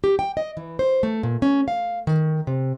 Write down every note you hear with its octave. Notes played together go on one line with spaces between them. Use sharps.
G4
G5
D#5
E3
C5
A3
A#2
C#4
F5
D#3
C3